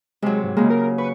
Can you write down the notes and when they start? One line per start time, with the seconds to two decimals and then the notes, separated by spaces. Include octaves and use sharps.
0.22 C3 F#3 G#3
0.44 G#2
0.57 C#3 G#3 A#3
0.70 A#4
0.98 B4 C#6